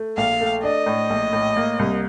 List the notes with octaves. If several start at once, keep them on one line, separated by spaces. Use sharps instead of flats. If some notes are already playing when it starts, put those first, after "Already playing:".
Already playing: A3
A#1 F5
A3
D4 D#5
A2
A#1
A2
A#3
C2